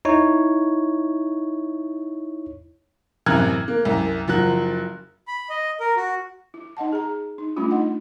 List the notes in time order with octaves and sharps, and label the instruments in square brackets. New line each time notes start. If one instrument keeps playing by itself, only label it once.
[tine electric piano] D#4 E4 C#5
[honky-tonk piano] A1 F#2 C3 F6 F#6 G#6
A#3
C2 F#2
F#1 F3 F#3 F#6
[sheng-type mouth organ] B5
D#5
A#4
F#4
[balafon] E4
D#4 D#5 F#5 A5
G#4 A#5
D#4
G3 A3 C#4 D4 E4 F4
D#4 D#5 F#5